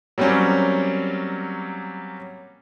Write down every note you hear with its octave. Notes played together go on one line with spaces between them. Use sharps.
F#3 G3 A#3 C4 C#4